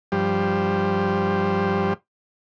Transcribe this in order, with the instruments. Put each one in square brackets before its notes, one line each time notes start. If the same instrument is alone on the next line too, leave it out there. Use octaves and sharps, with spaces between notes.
[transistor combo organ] G2 F3 G3 G4 C5